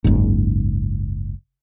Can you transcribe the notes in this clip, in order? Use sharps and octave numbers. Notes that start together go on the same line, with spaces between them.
F#1 C#2 G#2